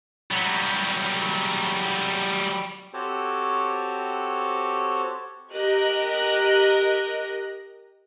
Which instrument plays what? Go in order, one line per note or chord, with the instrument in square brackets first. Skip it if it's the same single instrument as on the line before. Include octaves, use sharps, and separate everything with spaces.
[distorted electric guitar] F#3 G3
[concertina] C4 F#4 G4 A4 C5 C#5
[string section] G4 A#4 D#5 F#6